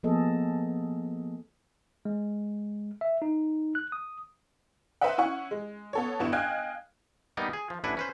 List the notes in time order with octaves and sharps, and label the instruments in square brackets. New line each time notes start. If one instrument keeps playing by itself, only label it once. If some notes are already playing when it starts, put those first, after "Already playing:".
[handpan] F3 A#3 B3 G#4 A4 D#5
[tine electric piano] G#3
E5
D#4
F#6
D#6
[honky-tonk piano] B4 C5 D#5 E5 F#5
C#4 E4 F#5 C#6
G#3
B3 A4 C#5
G1 G2 B3 E4 C#6 E7
D#5 F5 G5 G#5 F#6 G#6
[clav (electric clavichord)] G3 A#3 B3 D#4 A#4 D#5
G#4
F3
A1 D4 E4 B4 F#5 G#5
C#4 B4 C5